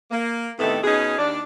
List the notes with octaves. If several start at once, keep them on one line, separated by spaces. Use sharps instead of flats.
A#3
A2 C3 D#3 A3 B3 A4
B2 C#4 D#4 G#4
D#2 D4 D5